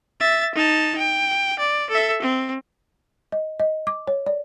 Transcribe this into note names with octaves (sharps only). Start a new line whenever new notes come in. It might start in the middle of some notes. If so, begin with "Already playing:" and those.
E5 A6
D#4 A5
G5
D5
A4 E5
C4
D#5
D#5
D6
C#5
D5